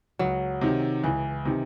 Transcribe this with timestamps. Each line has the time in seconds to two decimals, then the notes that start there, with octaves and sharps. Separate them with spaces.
0.19 C#2 F#3
0.61 C3 D#3
1.04 C#2 E3
1.45 C3 D#3